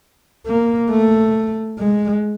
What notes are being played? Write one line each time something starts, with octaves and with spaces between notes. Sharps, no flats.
A#3
A3
G#3